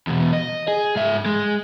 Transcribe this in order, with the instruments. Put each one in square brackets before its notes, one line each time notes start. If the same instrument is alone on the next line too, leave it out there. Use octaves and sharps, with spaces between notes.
[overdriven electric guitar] E2 B2
D#5
G#4
G#2 E5
G#3